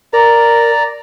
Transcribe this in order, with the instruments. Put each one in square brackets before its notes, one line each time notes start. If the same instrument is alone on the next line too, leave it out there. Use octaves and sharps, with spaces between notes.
[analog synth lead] A#4 [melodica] D5 A#5